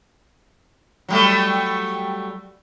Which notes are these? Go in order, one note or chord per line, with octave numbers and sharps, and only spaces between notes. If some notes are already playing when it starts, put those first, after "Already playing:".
F#3 G3 A3